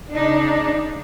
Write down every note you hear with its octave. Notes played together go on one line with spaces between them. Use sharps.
C#3 D4 D#4